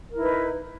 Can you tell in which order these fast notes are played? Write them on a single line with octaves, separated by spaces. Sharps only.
A#4 E4 D#4 B4